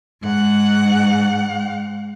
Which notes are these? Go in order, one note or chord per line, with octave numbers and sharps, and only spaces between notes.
G#2 F#5